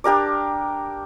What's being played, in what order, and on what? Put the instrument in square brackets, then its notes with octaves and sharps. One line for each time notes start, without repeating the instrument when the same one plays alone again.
[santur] D4 G4 A#4 D5